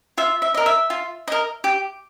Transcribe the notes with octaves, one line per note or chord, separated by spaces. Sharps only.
F4 E5
E5
A#4 D#5
E5
F4
A#4 D#5
G4